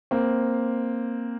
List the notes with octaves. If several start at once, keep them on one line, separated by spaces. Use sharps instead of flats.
A#3 C4